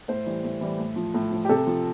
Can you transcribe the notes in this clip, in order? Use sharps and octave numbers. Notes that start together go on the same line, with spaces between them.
A2 C5
E3 G3
A2
E3 G3
A2
F3
A2
F3
G4
C3 A4
F3